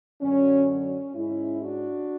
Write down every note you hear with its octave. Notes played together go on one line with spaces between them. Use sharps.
F#2 D3 F#3 C#4
C#4
G#2 G#3 C#4 E4
D4 F#4